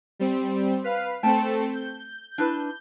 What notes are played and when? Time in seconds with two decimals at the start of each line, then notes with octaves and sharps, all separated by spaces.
0.19 G3 C4
0.84 B4 F5
1.23 A3 C4 A4 G5 A5
1.73 G6
2.38 D4 E4 B4